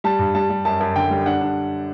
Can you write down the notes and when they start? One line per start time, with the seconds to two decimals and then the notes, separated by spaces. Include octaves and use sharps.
0.04 G3 A5
0.19 G2
0.35 G3 A5
0.50 G3
0.65 F#2 A5
0.80 F#2 A5
0.96 D3 G5
1.10 G3
1.26 D4 F#5
1.41 D4